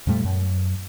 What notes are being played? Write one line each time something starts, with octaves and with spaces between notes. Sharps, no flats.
F2 A#2 G3 A3
F#2